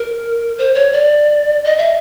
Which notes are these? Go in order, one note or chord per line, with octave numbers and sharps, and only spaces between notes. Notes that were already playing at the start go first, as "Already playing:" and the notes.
Already playing: A#4
C5
C#5
D5
D#5
E5